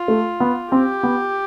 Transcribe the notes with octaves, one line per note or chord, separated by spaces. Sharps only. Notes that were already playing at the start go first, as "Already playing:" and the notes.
Already playing: F4
A3
B3
C4 G4
B3